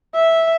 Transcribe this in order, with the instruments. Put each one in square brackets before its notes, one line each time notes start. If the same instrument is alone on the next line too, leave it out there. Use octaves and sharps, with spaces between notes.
[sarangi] E5